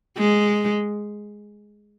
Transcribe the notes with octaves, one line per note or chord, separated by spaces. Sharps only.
G#3